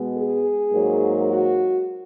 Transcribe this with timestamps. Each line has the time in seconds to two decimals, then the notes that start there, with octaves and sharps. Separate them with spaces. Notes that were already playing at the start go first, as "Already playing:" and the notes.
Already playing: B2 G#3 B3
0.16 G#4
0.72 G#2 F#3 A#3
1.27 F#4